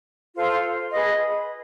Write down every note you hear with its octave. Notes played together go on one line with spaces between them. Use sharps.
F4 A4 C5 F5
G#4 B4 D#5